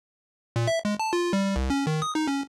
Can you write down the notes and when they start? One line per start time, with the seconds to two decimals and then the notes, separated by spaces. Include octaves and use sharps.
0.56 A#2
0.67 E5
0.85 G#3
1.00 A5
1.13 F4
1.33 G3
1.56 C2
1.70 C#4
1.87 D#3
2.02 D#6
2.15 D#4
2.27 C#4